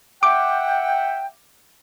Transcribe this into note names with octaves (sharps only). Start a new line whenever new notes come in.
E5 F#5 G5 D6